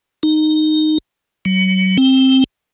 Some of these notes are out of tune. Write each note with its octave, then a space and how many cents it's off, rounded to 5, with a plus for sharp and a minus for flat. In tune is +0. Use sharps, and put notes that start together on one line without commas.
D#4 -10
F#3 +30
C4 +10